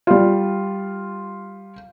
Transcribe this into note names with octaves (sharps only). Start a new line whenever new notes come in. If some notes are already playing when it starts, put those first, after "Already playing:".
G3 F4